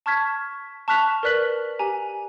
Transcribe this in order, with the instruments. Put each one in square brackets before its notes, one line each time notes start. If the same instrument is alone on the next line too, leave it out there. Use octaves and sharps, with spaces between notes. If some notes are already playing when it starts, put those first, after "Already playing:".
[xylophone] A5 C#6 F6 G#6 B6
A5 C#6 F6 F#6 B6 F7
A#4 B4 D5 F#6 B6 F#7
G4 G#5 A#5